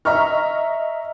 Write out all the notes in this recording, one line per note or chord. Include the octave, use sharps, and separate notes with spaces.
D#5 E5 A#5 C#6 F6